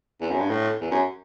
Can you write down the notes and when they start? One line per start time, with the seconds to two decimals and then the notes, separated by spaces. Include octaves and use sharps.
0.21 E2
0.31 F#2
0.40 G2
0.50 A2
0.81 E2
0.91 F#2